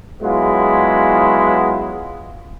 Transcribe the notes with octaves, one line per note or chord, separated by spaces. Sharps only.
F#3 G#3 B3 E4 F4